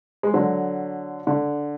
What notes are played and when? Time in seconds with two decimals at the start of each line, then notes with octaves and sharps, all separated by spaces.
0.23 G#3
0.34 D3 F#3
1.27 D3